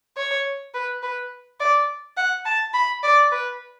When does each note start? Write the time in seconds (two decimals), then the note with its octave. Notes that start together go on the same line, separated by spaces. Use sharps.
0.17 C#5
0.74 B4
1.03 B4
1.60 D5
2.17 F#5
2.45 A5
2.74 B5
3.03 D5
3.32 B4